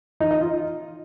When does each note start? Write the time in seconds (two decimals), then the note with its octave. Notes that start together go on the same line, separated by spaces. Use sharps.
0.20 D#4
0.31 D#5
0.41 F4